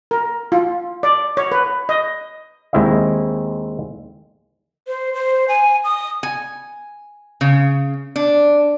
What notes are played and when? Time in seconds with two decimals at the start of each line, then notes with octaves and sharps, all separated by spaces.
0.11 A#4
0.52 F4
1.03 D5
1.37 C#5
1.52 B4
1.89 D#5
2.73 D#2 G#3 C4 E4 D#5 E5
4.87 C5
5.14 C5
5.48 G#5
5.84 D#6
6.23 G#5
7.41 C#3
8.16 D4